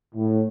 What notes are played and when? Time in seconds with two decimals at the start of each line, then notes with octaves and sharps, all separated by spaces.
0.15 A2